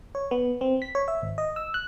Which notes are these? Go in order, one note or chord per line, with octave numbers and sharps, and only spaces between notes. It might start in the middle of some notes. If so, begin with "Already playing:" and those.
C#5
B3
C4
B6
C#5
E5
G#1
D#5
E6
F#6